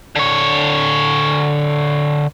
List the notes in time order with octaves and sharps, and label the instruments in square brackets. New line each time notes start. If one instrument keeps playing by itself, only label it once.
[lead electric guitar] D3 C#5